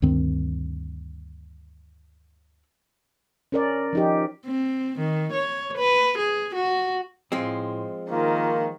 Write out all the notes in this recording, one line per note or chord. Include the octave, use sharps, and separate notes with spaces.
D2 G2 D#3 C4
C#4 A#4 D5
F3 D#4 G4
C4
D#3
C#5
B4
G#4
F#4
A2 F3 G#3 C4
D#3 A#3 F4